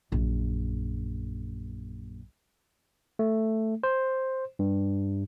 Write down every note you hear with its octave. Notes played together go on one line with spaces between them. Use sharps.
A#1 F#2
A3
C5
G2